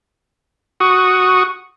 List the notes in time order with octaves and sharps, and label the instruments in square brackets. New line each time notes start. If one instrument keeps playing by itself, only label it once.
[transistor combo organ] F#4 C#6 D#6